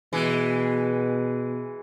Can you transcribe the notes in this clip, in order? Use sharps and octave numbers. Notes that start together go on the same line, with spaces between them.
B2 E3 G#3